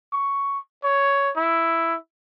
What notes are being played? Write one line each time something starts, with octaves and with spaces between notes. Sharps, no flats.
C#6
C#5
E4